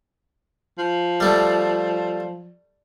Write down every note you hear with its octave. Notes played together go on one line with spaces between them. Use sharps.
F3
G3 A3